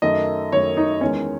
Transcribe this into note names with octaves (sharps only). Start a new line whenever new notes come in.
F#2 D#3 A3 D#5
F#2 D#3 A3 C#5
D#4
E2 D#3 G#3 C#4